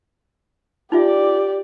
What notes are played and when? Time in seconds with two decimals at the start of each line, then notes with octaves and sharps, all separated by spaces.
0.92 D#4 F4 G4 D5 E5